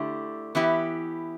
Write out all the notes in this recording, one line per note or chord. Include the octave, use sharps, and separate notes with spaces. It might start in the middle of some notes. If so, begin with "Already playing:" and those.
Already playing: D3 A3 E4 G4
E3 B3 E4 G4